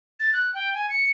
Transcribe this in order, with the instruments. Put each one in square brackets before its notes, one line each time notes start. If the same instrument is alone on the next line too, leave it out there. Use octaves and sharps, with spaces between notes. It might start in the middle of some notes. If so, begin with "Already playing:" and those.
[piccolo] A6
F#6
G5
G#5
C#7